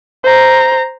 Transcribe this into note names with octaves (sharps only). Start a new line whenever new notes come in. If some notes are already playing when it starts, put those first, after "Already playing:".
C5 A#5